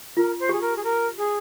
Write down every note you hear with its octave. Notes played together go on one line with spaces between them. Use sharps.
F4 A#4
C5
G4 G#4
A#4
G#4
A#4
G#4